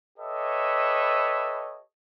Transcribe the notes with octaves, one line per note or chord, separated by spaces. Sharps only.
G4 A4 B4 C#5 D#5 E5